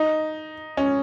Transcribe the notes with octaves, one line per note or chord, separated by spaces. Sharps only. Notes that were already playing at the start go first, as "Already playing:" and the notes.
Already playing: D#4
C#4